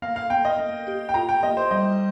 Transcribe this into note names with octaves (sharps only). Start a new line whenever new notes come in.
A#3 F5
F5
A#3 G5
D#5
A#3
G4
G5
F4 A#5
G5
A#3 D#5
C5
G3 D#5